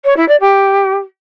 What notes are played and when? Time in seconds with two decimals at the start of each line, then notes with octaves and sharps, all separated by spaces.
0.04 C#5
0.16 E4
0.28 D5
0.40 G4